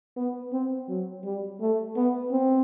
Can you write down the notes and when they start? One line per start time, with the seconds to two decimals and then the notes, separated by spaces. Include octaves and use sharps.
0.17 B3
0.52 C4
0.89 F#3
1.24 G3
1.61 A3
1.97 B3
2.32 C4